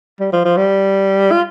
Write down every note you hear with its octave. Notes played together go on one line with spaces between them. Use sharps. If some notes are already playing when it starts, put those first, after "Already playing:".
G3
F3
F3
G3
F4